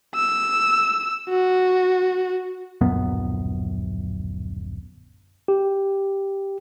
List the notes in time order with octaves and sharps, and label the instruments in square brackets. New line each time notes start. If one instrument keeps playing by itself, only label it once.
[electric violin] E6
F#4
[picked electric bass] D1 A#1 F#2 B3
[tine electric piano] G4